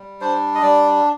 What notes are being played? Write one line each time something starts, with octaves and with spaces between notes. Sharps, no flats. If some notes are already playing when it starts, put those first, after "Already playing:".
Already playing: G3
D4 C5
D#5
G3 D5